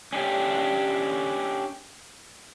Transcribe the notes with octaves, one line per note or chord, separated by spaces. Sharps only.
C#4 D4 G4